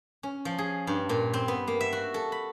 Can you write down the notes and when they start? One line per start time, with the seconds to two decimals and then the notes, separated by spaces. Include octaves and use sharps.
0.23 C#4
0.45 F3
0.58 G#4
0.87 G2
1.09 A#2
1.34 C4
1.48 B3
1.68 A#3
1.81 E5
1.93 F#4
2.14 A4
2.32 B5